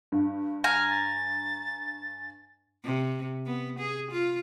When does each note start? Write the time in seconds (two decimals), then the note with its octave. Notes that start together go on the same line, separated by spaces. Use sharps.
0.12 G2
0.64 G#5 A#5 F6
0.90 A6
2.85 C3
3.47 B3
3.79 G#4
4.11 F4